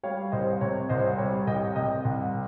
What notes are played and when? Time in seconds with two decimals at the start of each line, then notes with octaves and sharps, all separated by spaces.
0.03 G3 C#5 F5
0.32 C2 C5 D#5
0.61 C3 C#5
0.89 C2 C5 D#5
1.18 G3 C#5
1.47 C2 D#5 G5
1.76 C3 D#5 G5
2.05 C2